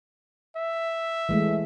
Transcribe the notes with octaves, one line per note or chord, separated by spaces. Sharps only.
E5
E3 G#3 A3